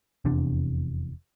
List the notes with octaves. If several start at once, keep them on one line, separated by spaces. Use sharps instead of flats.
F1 E2 C3 D4